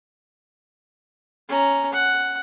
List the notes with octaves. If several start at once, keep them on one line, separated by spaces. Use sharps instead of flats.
C#4 A#5
F#5